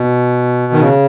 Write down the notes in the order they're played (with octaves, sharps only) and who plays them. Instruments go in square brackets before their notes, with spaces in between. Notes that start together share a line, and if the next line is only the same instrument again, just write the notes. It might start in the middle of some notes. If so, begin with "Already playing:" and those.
Already playing: [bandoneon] B2
D#3
C#3